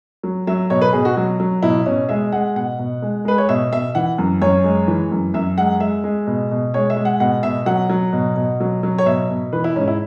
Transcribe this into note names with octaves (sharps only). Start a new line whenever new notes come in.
F#3
F#3 E5
B2 C#5
B4
B2 G#4
F#4
F#3
F#3
B2 E4
B2 C#4
G#3 E5
G#3 F#5
B2 F#5
B2
G#3
G#3 B4
C#5
B2 E5
B2 E5
E3 F#5
F#2
F#2 C#5
G#3
E3
F#2
F#2 E5
G#3 F#5
G#3 E5
G#3
B2
B2
G#3 C#5
E5
G#3
F#5
B2 F#5
B2 E5
F#3 F#5
F#3
B2
B2
F#3
F#3
C#5
B2 E5
B2
E3 B4
E4
G#2 C#4
E4